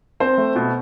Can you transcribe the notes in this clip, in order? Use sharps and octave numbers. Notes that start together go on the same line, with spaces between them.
C4 C5
A3
B2